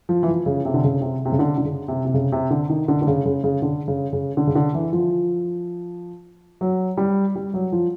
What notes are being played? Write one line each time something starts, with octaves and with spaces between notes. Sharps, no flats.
F3
E3
F3
C#3
C3
D3
C#3
C3
C3
C#3
D3
D3
C#3
C3
C3
C#3
C3
D3
D#3
D3
D3
C#3
C#3
C#3
D3
C#3
C#3
D3
C#3
D3
E3
F3
F#3
G3
G3
F#3
F3